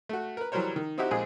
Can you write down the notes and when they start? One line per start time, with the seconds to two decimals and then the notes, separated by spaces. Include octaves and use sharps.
0.09 A3 F#4
0.37 A#4 B4
0.52 E3 F#3 G3 A#4 C5 C#5
0.76 D#3
0.98 C4 D#4 E4 F#4 G4
1.11 A#1 G#3 C4 G#4